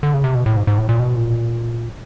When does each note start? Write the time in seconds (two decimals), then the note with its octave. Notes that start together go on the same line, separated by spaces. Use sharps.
0.03 D3
0.14 C#3
0.24 C3
0.35 B2
0.46 A2
0.56 G#2
0.67 G#2
0.78 A2
0.89 A#2
1.00 B2
1.16 A#2